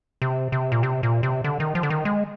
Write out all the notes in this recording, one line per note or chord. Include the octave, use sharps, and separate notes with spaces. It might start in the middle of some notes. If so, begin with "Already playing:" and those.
C3
C3
A#2
C3
A#2
C3
D3
D#3
F3
D3
D#3
G#3